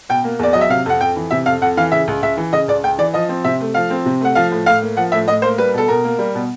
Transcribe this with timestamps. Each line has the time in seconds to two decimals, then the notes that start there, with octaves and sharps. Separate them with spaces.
0.09 B2 G5
0.24 A#3
0.39 E2 D5
0.53 F#3 D#5
0.61 E5
0.70 C3 F5
0.86 F2 F#5
1.01 F2 G5
1.16 E3
1.31 C3 E5
1.46 F2 F5
1.62 F2 F#5
1.77 E3 F5
1.92 C#3 E5
2.07 C#2
2.22 C#2 E5
2.37 E3
2.53 C#3 D#5
2.68 C#2 D5
2.84 C#2 G5
2.98 E3 D5
3.14 F3 D#5
3.29 C4
3.44 C3 E5
3.60 A3
3.74 F3 F5
3.90 C4
4.06 C3
4.21 A3 F#5
4.35 F3 F5
4.51 A2
4.66 A2 F5
4.82 A#3
4.97 F3 F#5
5.12 A2 E5
5.28 A2 D#5
5.42 A#3 C5
5.58 G3 B4
5.74 B2 A4
5.88 B2 A#4
6.04 A#3
6.19 G3
6.35 B2